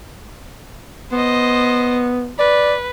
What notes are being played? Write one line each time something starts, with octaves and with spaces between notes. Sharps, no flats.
B3 C5 D#5
B4 D5